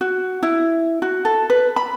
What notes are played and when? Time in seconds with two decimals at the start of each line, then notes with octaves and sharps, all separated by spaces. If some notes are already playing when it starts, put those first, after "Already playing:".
0.01 F#4
0.43 E4
1.02 F#4
1.25 A4
1.50 B4
1.76 B5